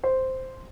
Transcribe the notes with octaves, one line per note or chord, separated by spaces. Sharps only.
C5